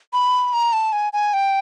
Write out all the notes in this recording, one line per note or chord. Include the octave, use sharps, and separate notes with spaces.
B5
A#5
A5
G#5
G#5
G5